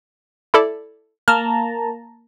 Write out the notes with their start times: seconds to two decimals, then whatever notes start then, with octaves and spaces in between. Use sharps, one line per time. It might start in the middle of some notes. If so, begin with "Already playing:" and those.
0.54 E4 A4 D5
1.28 A#3 A5 A#5 F6